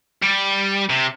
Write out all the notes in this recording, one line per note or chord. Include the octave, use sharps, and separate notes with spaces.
G3
C3